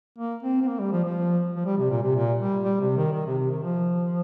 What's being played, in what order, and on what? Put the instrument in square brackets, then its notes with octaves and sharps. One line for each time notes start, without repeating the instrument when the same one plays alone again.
[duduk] A#3
C4
C4
A#3
G3
F3
F3
F3
G3
C3
A#2
C3
A#2
G3
G3
C3
D#3
D#3
C3
C3
D#3
F3